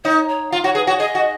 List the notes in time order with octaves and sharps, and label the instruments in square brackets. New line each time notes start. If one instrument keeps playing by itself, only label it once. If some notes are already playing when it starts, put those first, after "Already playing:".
[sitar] D#4 [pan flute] C#5
[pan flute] C#5
[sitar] F4
[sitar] F#4 [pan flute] C#5
[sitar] G#4 [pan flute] B4
[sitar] F#4 [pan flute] C#5
[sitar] G#4 [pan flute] D#5
[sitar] F#4